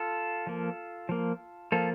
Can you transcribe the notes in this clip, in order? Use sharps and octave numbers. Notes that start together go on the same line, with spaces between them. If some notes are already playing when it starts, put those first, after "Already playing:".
Already playing: F4 A4
F3 A#3
F3 A#3
F3 A#3 F4 A4